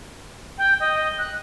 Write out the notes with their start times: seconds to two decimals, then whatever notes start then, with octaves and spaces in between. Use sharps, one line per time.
0.58 G5
0.80 D#5
1.19 F#6